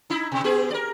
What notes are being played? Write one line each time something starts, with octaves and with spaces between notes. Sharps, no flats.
D#4 E4
B2
B3 G4 G#4
A#4 D5